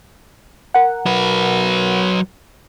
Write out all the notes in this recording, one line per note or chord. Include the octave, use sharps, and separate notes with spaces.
A#4 F#5
F#3 B4